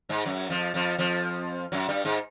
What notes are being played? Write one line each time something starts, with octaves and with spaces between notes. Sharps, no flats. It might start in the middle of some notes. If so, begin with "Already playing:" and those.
G#2 G#3
F#2 F#3
F2 F3
F2 F3
F2 F3
F#2 F#3
G2 G3
G#2 G#3